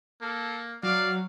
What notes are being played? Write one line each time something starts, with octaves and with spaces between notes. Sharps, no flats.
A#3 A4
F#3 D5 F5